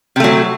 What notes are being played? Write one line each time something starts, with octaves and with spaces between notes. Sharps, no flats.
C3 F#3 A3